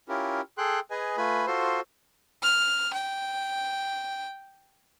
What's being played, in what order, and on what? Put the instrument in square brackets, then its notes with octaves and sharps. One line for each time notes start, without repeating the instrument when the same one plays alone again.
[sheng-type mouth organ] C#4 E4 F4 G4 A#4
G#4 A4 G5 C6 F#6
G#4 B4 D#5 G#5
A3 F4 B4 G#5 B5
F4 F#4 A4 C5 C6
[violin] F6
G5